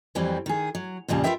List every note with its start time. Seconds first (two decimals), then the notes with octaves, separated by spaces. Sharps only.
0.15 F2 E3 F#3 G3 C4
0.46 D#3 G#4
0.75 F#3
1.08 F2 A#2 C#3 G3 A5
1.24 F4 G4 A#4 B4 E5 G5